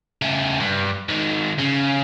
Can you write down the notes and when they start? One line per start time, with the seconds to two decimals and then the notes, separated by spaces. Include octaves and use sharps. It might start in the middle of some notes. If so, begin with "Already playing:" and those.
0.22 C#3 A3
0.60 G2
1.09 G#2 D#3
1.58 C#3